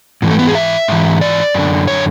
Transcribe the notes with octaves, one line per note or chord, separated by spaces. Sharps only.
G#2 E3
A3
B3
G#4
E5
G#2 E3
D5
F#2 D3
C#5